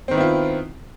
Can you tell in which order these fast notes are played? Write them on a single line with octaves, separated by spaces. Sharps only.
C4 D#3 B3 E4 F4